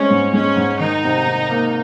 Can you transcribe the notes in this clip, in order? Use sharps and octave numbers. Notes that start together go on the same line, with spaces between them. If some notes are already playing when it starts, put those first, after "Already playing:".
Already playing: G#3 C4 C#4
G#2
G#3 C#4
G#2
D#3 D#4
C3
C3
A#3